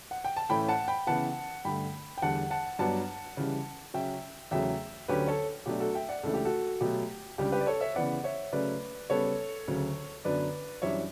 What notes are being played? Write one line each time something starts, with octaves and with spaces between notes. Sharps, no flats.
F#5
G5
A5
A2 E3 A3 C#4 G5 B5
F#5 A5
G5 B5
C#3 E3 B3 F#5 A5
G2 D3 A3 G5 B5
G5
E2 D3 G3 F#5 A5
F#5 A5
G2 F#3 B3 D4 F#5 A5
C#3 E3 G3
C#3 F#3 C#4 E5 G5
E2 C#3 F#3 A3 E5 G5
D2 D3 F#3 C#4 G4 B4
A4 C#5
B2 F#3 A3 D4 G4
F#4 A4
E5 G5
D5 F#5
C#2 C#3 E3 A3 D4 A4
G4
F#4 A4
B2 F#3 A3 G4
C#2 C#3 G3 D4 G4
G4 B4
D5
A4 C#5
C#5 E5
C#3 E3 B3 D5 F#5
C#5 E5
C#3 F#3 A3 C#4 B4 D5
C#3 G3 B3 A4 C#5
D2 C#3 F#3
F#2 D3 F#3 B3 D4 B4 D5
F#2 E3 G3 D4 C#5 E5